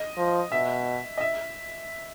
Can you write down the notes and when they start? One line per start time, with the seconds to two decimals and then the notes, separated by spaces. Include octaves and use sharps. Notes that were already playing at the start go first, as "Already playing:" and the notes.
Already playing: D#5
0.17 F3
0.51 B2 E5
1.18 D#5
1.21 E5